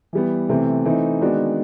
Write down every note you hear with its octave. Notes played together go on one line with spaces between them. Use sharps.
E3 G3 B3
C3 E3 A3 C4
E3 A3 C4 D#4
D#3 G#3 B3 D4 F#4